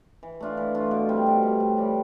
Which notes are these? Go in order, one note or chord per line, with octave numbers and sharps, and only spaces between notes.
E3
A3 D4 F4
E3
A3 D4 F4
B2
G3 C4
B2
G3 C4
A2
E3 G3